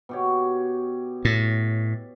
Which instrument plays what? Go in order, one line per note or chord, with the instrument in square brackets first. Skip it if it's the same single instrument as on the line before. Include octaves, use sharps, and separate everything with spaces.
[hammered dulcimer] B2 G4 C#5
[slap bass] A2